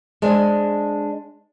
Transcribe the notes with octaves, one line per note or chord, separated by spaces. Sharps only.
G#3 D4 C5 G#5